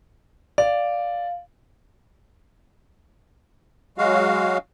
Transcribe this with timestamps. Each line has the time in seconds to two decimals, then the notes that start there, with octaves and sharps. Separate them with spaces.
0.58 D5 F5
3.98 F#3 G#3 F#4 F5